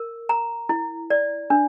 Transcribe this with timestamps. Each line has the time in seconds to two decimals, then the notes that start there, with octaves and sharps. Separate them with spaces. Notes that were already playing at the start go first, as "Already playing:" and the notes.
Already playing: A#4
0.29 A#5
0.69 E4
1.10 D5
1.50 D4